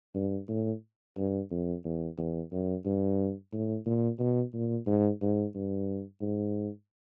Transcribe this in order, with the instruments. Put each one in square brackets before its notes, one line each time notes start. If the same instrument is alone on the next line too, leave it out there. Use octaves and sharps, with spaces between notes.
[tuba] G2
A2
G2
F2
E2
E2
F#2
G2
A2
A#2
B2
A#2
G#2
G#2
G2
G#2